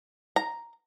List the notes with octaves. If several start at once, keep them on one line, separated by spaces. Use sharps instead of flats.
A#5